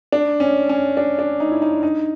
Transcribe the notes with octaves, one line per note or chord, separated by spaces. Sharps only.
D4
C#4
C#4
D4
D4
D#4
E4
D#4
D#4